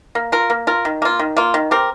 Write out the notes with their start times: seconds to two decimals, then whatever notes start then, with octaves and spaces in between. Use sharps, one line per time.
0.15 A#3
0.32 F4 A#4
0.50 A#3
0.67 F4 A#4
0.85 D#3
1.02 A#3 F4
1.19 D#3
1.37 A#3 F4
1.54 D#3
1.71 C4 G4 A#4